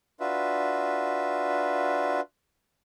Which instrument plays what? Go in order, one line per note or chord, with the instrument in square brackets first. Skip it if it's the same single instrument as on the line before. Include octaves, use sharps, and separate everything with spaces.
[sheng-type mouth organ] D4 F4 F#4 B4 E5